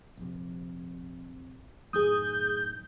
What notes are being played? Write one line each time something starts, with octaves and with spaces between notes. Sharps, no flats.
A#1 F2 C3
F#2 A2 D#3 G#4 D#6 G6